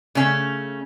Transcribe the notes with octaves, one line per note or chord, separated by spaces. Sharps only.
C#3 A3 C#4